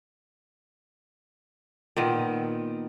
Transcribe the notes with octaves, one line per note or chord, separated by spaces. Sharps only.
A#2 D#3 B3